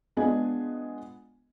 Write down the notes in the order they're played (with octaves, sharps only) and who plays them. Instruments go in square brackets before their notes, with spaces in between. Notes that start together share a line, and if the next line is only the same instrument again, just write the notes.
[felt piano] G#3 B3 D4 F4 D#5 G#5